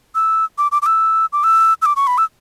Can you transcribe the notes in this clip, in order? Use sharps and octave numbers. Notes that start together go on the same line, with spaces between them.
E6
D6
D6
D6
E6
D6
E6
E6
D6
C#6
B5
E6